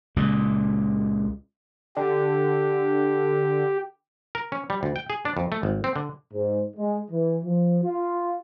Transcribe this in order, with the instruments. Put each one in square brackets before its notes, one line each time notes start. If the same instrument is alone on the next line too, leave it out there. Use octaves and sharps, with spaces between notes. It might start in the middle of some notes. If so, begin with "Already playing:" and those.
[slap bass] C#2 A#2
[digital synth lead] D3 [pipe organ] G4
[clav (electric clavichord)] A#4
C#4
G3
D2
G5
G#4
D4
F2
A3
G#1
C4
D3
[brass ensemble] G#2
G#3
E3
F3
F4